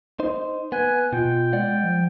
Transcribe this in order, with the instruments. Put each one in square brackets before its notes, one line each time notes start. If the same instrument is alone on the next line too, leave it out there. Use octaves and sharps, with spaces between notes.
[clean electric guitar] D#4 C5
[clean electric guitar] B3 [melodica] G#5 [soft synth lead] F#6
[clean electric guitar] B2 [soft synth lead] F4 [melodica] G5
[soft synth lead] G#3 [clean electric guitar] D5 F#5
[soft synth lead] F3